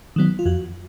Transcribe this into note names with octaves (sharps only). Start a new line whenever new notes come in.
D#3 F#3 B3
F4
F2 F#4